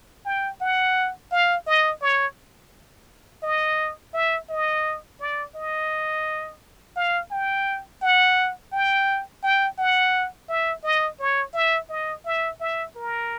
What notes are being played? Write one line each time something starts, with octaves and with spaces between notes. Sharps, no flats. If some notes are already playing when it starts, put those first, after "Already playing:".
G5
F#5
F5
D#5
C#5
D#5
E5
D#5
D5
D#5
F5
G5
F#5
G5
G5
F#5
E5
D#5
C#5
E5
D#5
E5
E5
A#4